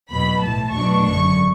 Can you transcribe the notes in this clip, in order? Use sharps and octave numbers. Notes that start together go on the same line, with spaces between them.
E2 B2 F#3 B5
B1 A2 E3 A5
E2 B2 F#3 A3 D4 C#6
G#1 F#2 D3 F#3 C#6